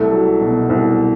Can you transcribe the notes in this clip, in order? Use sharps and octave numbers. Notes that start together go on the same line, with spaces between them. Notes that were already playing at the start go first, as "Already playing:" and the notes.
Already playing: C2 A3
F#3
B2
C2